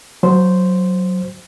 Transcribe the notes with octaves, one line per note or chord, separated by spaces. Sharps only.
F#3 C5